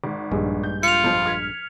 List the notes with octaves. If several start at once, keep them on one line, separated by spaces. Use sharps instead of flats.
G#1
A#1 G2 G#3
G6
F4 C#7 F7
F2 F3
F6 G#6 B6